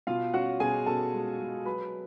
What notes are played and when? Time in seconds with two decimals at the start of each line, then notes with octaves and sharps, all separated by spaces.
0.07 B2 F4 F5
0.34 C#4 F#4 F#5
0.60 B2 G#4 G#5
0.86 B2 A4 A5
1.14 G#3
1.40 G#3
1.65 F#3 B4 B5